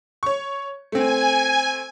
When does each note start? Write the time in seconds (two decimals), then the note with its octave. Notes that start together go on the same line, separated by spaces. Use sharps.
0.23 C#5 C#6
0.92 A3 C4 G#5